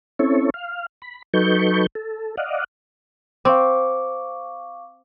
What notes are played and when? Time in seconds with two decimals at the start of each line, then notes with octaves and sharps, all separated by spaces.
0.19 C4 C#4 E4 A4 C#5
0.54 F5
1.02 B5
1.34 F#3 D#4 A4 B4 C#6 G6
1.95 A4
2.37 D5 D#5 F5 F#5
3.45 C4 F5 C#6 D6